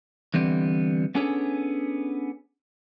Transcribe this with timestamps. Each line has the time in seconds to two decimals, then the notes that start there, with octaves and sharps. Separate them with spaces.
0.34 D3 E3 G3 B3 C4
1.15 B3 C#4 D4 G#4 A4 C#5